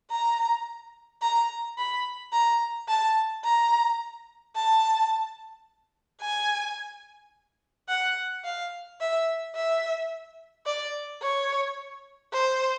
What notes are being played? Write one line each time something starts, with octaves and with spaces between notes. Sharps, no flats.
A#5
A#5
B5
A#5
A5
A#5
A5
G#5
F#5
F5
E5
E5
D5
C#5
C5